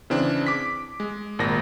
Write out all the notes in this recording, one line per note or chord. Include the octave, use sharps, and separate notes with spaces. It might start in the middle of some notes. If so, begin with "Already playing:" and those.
C#3 E3 C4 D4
D6 B6
G#3
G#1 A#2 A#6